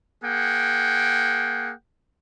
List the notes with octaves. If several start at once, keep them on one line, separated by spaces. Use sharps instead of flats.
A#3 G#4 F#5 G5